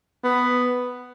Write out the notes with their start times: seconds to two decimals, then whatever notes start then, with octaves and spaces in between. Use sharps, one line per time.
0.24 B3